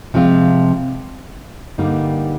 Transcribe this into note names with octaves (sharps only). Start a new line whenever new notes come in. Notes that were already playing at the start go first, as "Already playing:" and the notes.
C3 F3 G#3 C4 F4
G2 D3 G3 A#3 D#4